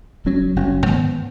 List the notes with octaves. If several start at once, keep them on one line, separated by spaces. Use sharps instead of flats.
F#1 F#2 F#3 C#4
F#1 F#2 F#3 C#4
G#2 D#3 B3